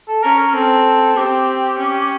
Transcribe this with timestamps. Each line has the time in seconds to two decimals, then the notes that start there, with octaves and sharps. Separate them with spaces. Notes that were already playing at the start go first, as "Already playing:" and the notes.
0.08 A4
0.23 C#4 A#4
0.39 A#4
0.54 C4 A4
1.17 C4 G4
1.78 C#4